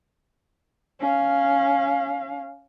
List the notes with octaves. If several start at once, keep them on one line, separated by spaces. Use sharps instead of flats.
C#4 F5